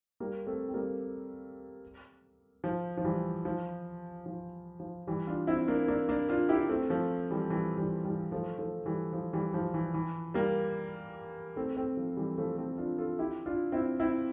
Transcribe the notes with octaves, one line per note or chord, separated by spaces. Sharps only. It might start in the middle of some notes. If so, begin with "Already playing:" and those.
G3 A#3
A3 C4
C4
G3 A#3
F3
F3
E3 G3
F3
F3
F3
E3 G3
D4 F4
C4 E4
A#3 D4
A#3 D4
A#3 D4
D4 F4
E4 G4
A3 C4
F3 A3
E3 G3
E3 G3
E3 G3
E3 G3
F3 A3
F3 A3
E3 G3
F3
E3 G3
F3
E3
E3
G3 A#3
A3 C4
A3 C4
F3
E3 G3
F3 A3
A3 C4
D4 F4
F4 A4
E4 G4
D4 F4
C4 E4
C4 E4